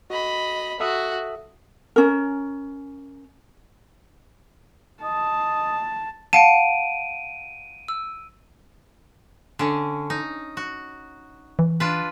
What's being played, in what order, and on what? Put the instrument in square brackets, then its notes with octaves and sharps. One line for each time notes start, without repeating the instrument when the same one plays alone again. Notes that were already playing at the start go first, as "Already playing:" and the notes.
[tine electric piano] F#4 [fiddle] D#5 B5
[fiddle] F#4 [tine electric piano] A4 E5 D#6
[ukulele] C#4 A#4
[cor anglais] D#5 [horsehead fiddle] A5
[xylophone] F5 F#5 A5 [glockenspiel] D7 D#7
[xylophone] E6
[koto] D3 C#4
D#4
F#4
[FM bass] E3
[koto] D4 F4 B4